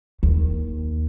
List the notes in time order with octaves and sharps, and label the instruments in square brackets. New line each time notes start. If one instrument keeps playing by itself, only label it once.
[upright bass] D#2